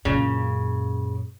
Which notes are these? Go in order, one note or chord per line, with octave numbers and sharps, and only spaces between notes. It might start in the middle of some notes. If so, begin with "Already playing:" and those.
F#2 A#2 C#3